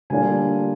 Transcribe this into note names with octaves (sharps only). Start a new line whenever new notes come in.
D3 G3 A#3 D4 F4 G#5